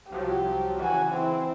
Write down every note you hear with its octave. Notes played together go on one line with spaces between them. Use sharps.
C2 F3 F#3 G4
C#3 E3 F#4 G#5
C4 E4